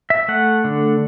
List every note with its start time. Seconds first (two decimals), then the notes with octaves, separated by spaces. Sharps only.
0.10 E5
0.28 A3 F#5
0.64 D3